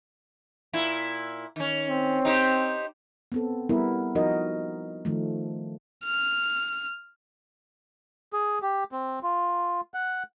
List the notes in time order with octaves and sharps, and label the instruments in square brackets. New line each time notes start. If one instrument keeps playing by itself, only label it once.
[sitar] A#2 E4
D#3 C#4
[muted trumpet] C4
[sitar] D#4 G4 C5
[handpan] B3 C4 A4
G3 B3 E4 A#4
F3 D#4 F#4 A#4 D#5
D#3 F3 A3
[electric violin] F6
[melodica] G#4
G4
C4
F4
F#5